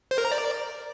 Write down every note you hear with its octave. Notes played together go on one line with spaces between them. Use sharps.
C5
A#4
A#5
D5